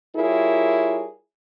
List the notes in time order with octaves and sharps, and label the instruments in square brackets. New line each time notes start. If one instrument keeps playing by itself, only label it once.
[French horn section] G3 E4 F4 G#4 A#4 C#5